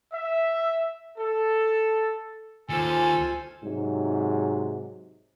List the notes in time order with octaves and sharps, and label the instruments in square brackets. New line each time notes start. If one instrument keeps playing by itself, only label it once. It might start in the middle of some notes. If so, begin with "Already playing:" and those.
[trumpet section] E5
A4
[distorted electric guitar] D#2 [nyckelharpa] F4 C5 [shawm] A4 [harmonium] G#5
[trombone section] G#2 C3 F#3